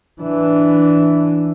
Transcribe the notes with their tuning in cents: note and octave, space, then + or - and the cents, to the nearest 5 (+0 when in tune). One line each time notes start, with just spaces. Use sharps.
E3 +0 D4 +0